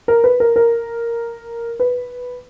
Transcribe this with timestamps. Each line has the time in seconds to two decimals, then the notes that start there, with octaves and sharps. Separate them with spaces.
0.08 A#4
0.24 B4
0.40 A#4
0.56 A#4
1.80 B4